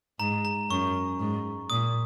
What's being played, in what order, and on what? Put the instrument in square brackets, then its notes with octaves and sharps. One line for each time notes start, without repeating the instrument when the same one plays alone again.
[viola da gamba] G#2 [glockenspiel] A#5
[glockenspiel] A#5
[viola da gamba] F#2 [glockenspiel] C#6
[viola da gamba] G#2
[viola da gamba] A#2 [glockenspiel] D#6